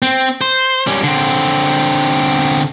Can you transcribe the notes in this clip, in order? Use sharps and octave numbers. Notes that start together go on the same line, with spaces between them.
C4
C5
G3 C#4
D3 C4